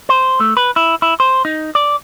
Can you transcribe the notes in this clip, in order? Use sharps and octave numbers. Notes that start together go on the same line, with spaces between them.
C5
A3
B4
E4
E4
C5
D#4
D5